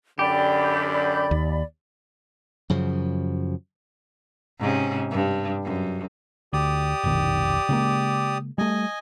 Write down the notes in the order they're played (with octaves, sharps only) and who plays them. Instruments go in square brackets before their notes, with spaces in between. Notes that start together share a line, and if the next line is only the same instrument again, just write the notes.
[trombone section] F#2 D3 [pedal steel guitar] G4 [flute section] D5 B5
[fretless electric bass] D#2
[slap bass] F#2 C#3 F3
[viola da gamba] G#2 C3 C#4
G2
F#2
[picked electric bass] D2 [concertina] G4 D5 D#6
[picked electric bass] F1 B1 D#3
C#3 G#3 A#3
[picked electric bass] G3 A3 [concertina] D#5 G#5